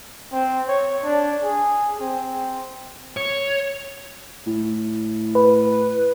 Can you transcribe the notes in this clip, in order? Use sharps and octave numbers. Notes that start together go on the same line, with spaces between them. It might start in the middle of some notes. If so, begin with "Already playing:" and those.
C4
C#5
D4
G#4
C4
C#5
A2
B4